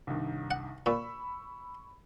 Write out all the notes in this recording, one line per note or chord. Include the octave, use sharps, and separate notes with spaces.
C2 G2 D#3
F#5
A#2 B5 C#6 E6